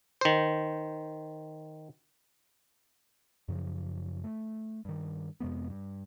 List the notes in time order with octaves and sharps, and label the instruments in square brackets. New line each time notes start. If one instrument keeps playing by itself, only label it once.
[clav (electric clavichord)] D#3 C5
[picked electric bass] F#2 C#3 F3
A3
G2 D#3
F2 C3 G#3 B3
G2